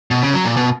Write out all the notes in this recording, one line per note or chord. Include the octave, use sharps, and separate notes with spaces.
B2
C#3
F#3
A#2
B2